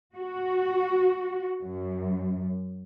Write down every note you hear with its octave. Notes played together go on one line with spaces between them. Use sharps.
F#4
F#2